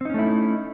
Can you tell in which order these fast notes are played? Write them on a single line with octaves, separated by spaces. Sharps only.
C4 D#4 C#4 A3 E4